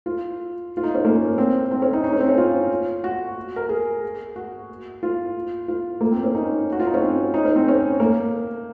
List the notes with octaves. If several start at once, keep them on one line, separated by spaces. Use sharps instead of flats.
F4
F4
D#4
C#4
A#3
C4
C4
C#4
D#4
D#4
C#4
C4
C#4
F4
F#4
A#4
G#4
F#4
F4
F4
A#3
C4
C#4
D#4
F#4
F4
D#4
C#4
C4
D#4
C#4
C4
C#4
A#3